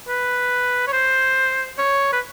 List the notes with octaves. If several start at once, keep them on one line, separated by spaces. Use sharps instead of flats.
B4
C#5
C5
C#5
B4